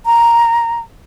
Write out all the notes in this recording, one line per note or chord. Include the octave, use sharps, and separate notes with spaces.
A#5